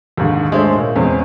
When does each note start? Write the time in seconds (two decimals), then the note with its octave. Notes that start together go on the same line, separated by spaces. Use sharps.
0.17 D#2 G#2 D3
0.52 G#3 A3 D4 C5 C#5 E5
0.75 A#2
0.96 E2 C#3 G#3 C4 C#4